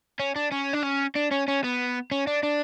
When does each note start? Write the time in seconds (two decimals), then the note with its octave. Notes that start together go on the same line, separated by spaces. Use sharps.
0.19 C#4
0.36 D4
0.52 C#4
0.74 D4
0.83 C#4
1.15 D4
1.31 C#4
1.48 C#4
1.64 B3
2.11 C#4
2.27 D4
2.43 D4